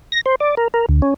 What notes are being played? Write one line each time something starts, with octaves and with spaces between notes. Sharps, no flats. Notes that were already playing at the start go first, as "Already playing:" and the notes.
A#6
C5
D5
A#4
A#4
D2
C#4